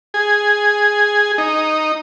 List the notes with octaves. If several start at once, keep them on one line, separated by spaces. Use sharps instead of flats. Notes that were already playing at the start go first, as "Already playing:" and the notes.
G#4
D#4